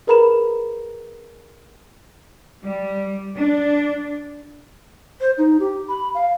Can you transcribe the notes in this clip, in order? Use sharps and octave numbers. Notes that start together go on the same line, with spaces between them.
G#4 A#4 B4 A#5 B5 E7
G3
D4
C5
D#4
G4
B5
F5